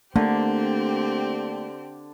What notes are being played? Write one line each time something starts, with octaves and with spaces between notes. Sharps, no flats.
D3 A3 A#3 C4 G4